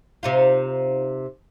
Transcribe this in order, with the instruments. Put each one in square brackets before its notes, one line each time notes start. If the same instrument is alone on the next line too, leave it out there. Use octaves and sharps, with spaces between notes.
[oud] C3 D#4 F4